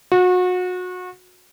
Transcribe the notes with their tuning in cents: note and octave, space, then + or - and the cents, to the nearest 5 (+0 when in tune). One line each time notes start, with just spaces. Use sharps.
F#4 -30